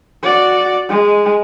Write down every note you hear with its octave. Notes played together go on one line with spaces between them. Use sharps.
F#4 D5
G#3